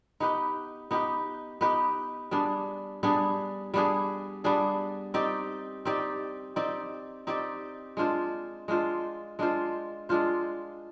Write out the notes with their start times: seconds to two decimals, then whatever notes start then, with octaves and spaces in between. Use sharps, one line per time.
0.20 B3 D#4 G4 B4
0.91 B3 D#4 G4 B4
1.61 B3 D#4 G4 B4
2.31 G3 B3 D4 G#4
3.03 G3 B3 D4 G#4
3.74 G3 B3 D4 G#4
4.44 G3 B3 D4 G#4
5.14 C4 D#4 G4 D5
5.85 C4 D#4 G4 D5
6.56 C4 D#4 G4 D5
7.27 C4 D#4 G4 D5
7.97 G#3 D4 F4 C5
8.68 G#3 D4 F4 C5
9.39 G#3 D4 F4 C5
10.09 G#3 D4 F4 C5